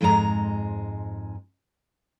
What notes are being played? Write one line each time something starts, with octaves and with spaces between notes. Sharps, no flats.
F2 G#2 G#3 A4 A#5